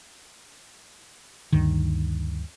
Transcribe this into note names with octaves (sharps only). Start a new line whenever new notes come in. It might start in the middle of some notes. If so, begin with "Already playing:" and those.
D2 G2 D#3